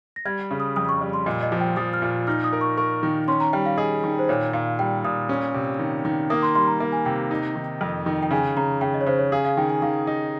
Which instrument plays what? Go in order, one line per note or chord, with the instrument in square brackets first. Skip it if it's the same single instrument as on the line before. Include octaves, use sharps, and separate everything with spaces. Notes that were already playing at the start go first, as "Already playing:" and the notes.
[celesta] A#6
[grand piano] G3 [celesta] G#6
[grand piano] C#3
[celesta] D#6
[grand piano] F2 [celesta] D#6
[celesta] C#6
[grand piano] G3
[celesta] C6
[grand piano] A#2 [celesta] D#5
[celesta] D#5
[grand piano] F3
[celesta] G5
[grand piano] F3 [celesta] D#6
[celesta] F6
[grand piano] A#2
[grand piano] D#4 [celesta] F6
[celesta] D#6
[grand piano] A#4
[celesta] C#6
[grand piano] A#4 [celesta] C#6
[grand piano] D#3
[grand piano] C#4 [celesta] C6
[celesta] A#5
[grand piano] G3 [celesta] G5
[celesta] F5
[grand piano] G#4 [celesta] D#5
[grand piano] D#3
[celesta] C5
[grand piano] A#2 [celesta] C#5
[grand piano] A#2 [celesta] F5
[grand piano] G3 [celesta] G5
[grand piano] A#2 [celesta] D#6
[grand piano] C#4
C3
D#3
D#3
[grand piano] A#3 [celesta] D#6
[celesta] C6
[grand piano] G3 [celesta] C6
[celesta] A#5
[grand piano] A#3
[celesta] G#5
[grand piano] C3 [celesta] G5
[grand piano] D#4
D#3
F2
D#3
[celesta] G5
[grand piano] C#3 [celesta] G#5
[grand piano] C#3 [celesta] A#5
[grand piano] C#3 [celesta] G5
[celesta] D#5
C#5
[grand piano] C#3 [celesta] C5
[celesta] C#5
[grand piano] G#4 [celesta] F5
[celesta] F5
[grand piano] D#3 [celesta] G5
[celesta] G#5
[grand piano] D#3 [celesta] F5
[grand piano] D#4 [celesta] D#5